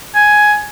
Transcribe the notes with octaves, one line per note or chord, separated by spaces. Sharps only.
G#5